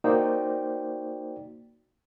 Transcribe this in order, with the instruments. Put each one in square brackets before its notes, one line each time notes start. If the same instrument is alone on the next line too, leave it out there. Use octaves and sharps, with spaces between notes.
[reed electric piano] A#3 D#4 F#4 C5 D5 G5